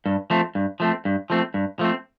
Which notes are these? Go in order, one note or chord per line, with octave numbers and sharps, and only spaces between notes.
G2
F3 A3 C4
G2
F3 A3 C4
G2
F3 A3 C4
G2
F3 A3 C4